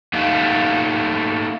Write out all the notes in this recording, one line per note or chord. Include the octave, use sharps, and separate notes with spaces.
A3 A#3 D#4 G4